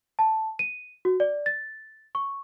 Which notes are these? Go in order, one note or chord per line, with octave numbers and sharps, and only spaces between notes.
A5
D#7
F#4
D5
A6
C#6